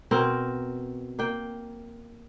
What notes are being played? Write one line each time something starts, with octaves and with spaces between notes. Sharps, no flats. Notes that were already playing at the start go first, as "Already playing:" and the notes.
B2 C4 A#4
A#3 G5